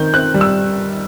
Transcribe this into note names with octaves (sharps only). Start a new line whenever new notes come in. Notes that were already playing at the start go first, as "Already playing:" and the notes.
Already playing: D#3 C4 G6
C4 F#6
G3
E6